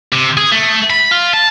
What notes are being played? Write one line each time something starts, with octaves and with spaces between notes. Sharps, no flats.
C3
G#4
A3
B5
F4
A5